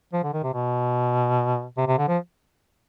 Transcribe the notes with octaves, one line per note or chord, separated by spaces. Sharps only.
F3
D3
D#3
C3
B2
C3
C3
D3
F3